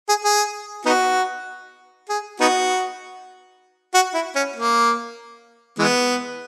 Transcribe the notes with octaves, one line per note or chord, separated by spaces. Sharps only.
G#4
G#4
B3 D#4 F#4
G#4
B3 D#4 F#4
F#4
E4
C#4
A#3
E3 G#3 B3